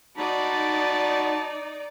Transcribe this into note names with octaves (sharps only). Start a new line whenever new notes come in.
D#4 F#4 D5 A5 B5